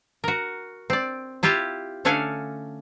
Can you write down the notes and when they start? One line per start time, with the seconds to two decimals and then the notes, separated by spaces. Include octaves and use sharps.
0.24 F#4 A#4
0.90 C4 D5
1.43 E4 F4 G4 E5 F5
2.05 D3 A3 C#4 D4 F5 G#5